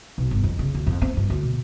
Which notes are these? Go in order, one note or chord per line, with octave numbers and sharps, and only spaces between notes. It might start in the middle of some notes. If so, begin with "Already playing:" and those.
B1
G1
F2
C#3
D2
F2
C4
G2
D2
B2